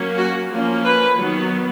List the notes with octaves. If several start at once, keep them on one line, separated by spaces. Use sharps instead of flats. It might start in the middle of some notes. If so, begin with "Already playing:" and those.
Already playing: F#3 A#3 C#4
F#4
F3 A#3 C#4
B4
D#3 F#3 B3